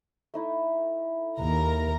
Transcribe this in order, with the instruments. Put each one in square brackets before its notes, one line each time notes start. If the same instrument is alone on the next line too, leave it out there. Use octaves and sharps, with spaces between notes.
[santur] A3 D#4 E4
[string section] D#2 A#4 A#5